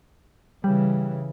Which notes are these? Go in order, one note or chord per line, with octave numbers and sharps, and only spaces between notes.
C#3 E3 G3